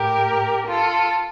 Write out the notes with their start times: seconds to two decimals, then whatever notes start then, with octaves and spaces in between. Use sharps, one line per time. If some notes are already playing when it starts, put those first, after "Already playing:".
Already playing: A2 G4 A#4
0.67 F4 A4